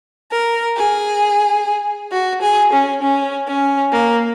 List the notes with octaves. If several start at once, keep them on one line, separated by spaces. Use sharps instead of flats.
A#4
G#4
F#4
G#4
C#4
C#4
C#4
A#3